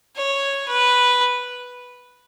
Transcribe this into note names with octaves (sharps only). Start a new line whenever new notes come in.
C#5
B4